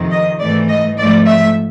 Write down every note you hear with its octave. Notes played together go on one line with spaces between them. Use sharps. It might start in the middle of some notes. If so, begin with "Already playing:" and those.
Already playing: F2 C3 D#3
D#5
G#2 E3 A3 D5
D#5
G#2 F3 A3 D5
E5